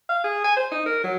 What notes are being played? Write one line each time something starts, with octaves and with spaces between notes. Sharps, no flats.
F5
G#4
G#5
C5
D#4
A#4
F#3